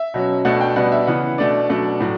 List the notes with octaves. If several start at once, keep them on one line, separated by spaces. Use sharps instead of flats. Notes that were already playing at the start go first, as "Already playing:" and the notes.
Already playing: E5
B2 F#3 C#4
B2 A3 D4 F#5
G5
B2 G3 B3 D4 F#5
E5
C#3 E3 B3 F#5
B2 A3 D4 D5
B2 F#3 A3 D4
A2 F#3